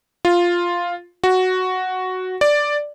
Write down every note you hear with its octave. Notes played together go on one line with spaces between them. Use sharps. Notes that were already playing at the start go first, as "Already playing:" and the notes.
F4
F#4
D5